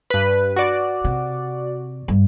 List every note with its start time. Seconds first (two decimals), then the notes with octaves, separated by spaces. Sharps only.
0.10 G2 B4
0.56 F#4 D5
1.04 C3
2.08 G2